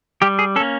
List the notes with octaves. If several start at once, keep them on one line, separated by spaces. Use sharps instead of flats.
G3 G4
G#4
A#3 C#4 A4